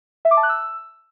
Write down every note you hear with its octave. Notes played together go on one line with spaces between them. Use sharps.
E5
D6
A5
F#6
E6